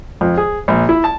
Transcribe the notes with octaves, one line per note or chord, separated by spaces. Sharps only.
F2
G#4
A#1
E4
A5